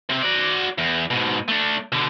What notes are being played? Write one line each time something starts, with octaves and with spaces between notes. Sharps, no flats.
C3 C4
F#4 D5
E2
G#2 B2
A3 D4
B2 D3